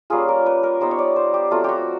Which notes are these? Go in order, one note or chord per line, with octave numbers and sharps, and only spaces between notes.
G3 A#3 C#4 F4 G#4
A#4
B4
A#4
G3 B3 D#4 C5
C#5
D5
C5
G4
F#3 A3 C4 F4
F#4 G4